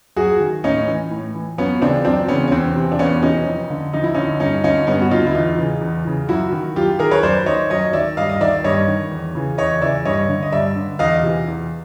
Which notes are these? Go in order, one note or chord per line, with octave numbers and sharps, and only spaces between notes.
F#2 F#4 G#4
D#3
A2 C#4 D#4
E3
A2
E3
F#2 B3 C#4
C#3 E3 C4 D4
F#2 C4 D4
C#3 E3 B3 C#4
C#4
E2 C4
C3 E3
D4
E2 B3 C#4
C3 E3 C#4 D#4
F2
D3
F2 D#4
E4
D3 C#4 D#4
G2 C#4 D#4
D3 C#4 D#4
G2 B3 C#4
F#4
D3 D#4 F4
E4
E2 D#4 F4
C#3 E3
E2
C#3 E3
F#2 E4 F#4
D#3
F#2 F4 G4
D#3 G#4 A#4
B4 C#5
F#2 C5 D5
D#3 C#5 D#5
F#2 C#5 D#5
D#3 D5 E5
G2 D#5 F5
D#5
D#3 D5 E5
G2 C#5 D#5
D#3
E2
C#3 E3
E2 C#5 D#5
C#3 E3 D5 E5
G2 C#5 D#5
D3
D#5
G2 D5 E5
D3
E2 D#5 F5
C3 E3
E2